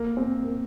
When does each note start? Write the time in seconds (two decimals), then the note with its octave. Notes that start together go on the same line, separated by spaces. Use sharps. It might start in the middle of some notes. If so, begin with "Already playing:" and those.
Already playing: A#3
0.17 C4
0.43 A#3